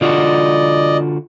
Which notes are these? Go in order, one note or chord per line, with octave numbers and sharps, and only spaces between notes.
D3 F4 F#4 D5 D#5